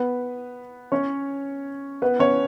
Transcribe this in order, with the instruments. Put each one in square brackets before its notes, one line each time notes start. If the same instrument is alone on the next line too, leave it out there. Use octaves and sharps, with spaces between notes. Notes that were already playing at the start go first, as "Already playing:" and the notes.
Already playing: [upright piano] B3 B4
C#4 C#5
B3 B4
C#4 C#5